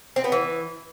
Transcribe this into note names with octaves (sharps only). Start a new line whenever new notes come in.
C4
B3
E3